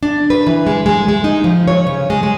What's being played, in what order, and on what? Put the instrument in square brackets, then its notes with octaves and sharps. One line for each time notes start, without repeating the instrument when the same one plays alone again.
[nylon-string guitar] D4
B4
E3
G#3
G#3
G#3
D#4
F3
C#5
C#3
G#3
G#3